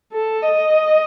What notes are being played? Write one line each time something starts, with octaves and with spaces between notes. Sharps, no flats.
A4
D#5